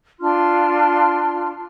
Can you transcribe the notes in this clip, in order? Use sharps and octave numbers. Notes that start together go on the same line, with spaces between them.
D4 F4 C6 F6